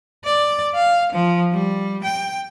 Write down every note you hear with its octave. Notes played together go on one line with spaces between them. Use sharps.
D5
F5
F3
G3
G5